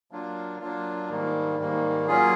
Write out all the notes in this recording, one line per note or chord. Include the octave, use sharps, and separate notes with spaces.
F#3 A#3 D4 F4
F#3 A#3 D4 F4
G#2 D#3 G3 A#3
G#2 D#3 G3 A#3
F#3 A#3 C#4 F4 G#4